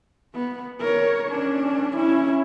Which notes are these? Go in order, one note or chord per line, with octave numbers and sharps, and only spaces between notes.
B3
A#4 C#5
C#4 D4
C#4 E4